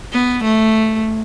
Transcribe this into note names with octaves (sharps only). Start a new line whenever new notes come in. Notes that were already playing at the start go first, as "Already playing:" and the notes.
B3
A3